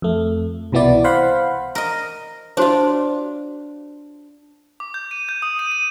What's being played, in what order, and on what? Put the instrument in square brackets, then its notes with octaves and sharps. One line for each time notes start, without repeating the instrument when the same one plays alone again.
[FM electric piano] F2 A3
C2 B2 E3 B3 E4 D5
C5 F5 F#5 B5 C6
[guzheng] A#4 D#5
[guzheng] D4 F4 [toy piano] F#4 C5 C#5
[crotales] D6
G6
D#7
G6
D#6
D#7
D#7